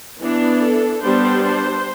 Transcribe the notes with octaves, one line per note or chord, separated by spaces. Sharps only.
E3 B3 D4
A4
G3 B3 D4 C5
C5